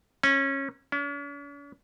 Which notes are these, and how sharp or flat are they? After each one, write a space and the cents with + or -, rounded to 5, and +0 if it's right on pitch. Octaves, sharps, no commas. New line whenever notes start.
C#4 -20
C#4 +45